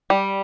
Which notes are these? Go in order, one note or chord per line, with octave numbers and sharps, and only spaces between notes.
G3